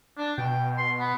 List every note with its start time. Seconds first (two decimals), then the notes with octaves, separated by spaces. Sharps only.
0.17 D4
0.38 B2 G5
0.78 C6
0.99 B3